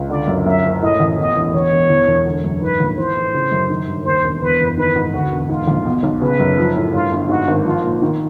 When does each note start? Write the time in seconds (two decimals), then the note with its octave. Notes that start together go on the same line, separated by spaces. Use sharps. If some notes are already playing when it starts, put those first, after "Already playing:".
Already playing: C#2
0.10 D3 D5
0.28 F#2
0.46 F#2 E5
0.63 F#1
0.82 A2 D#5
0.99 A1
1.18 E2 D#5
1.36 E1
1.53 E2 C#5
1.72 E1
1.90 E2
2.07 E1
2.25 D3
2.44 F#2
2.62 G#2 B4
2.80 A#1
2.98 E3 C5
3.16 A2
3.34 C#3
3.52 F#2
3.69 D#3
3.87 G2
4.05 D#2 C5
4.24 E1
4.42 E2 B4
4.60 F#1
4.77 D#3 B4
4.96 G#2
5.14 D2 F#4
5.32 E1
5.49 G#2 F4
5.67 A#1
5.85 B2
6.03 B1
6.22 C#3 B4
6.39 F#2
6.58 F3
6.76 A2
6.94 G2 F4
7.12 G1
7.29 G#2 F#4
7.48 G#1
7.66 F3 F4
7.84 A#2
8.02 D#3